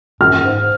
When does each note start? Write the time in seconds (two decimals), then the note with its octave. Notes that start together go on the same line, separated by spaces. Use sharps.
0.21 F#2 F6
0.42 G#2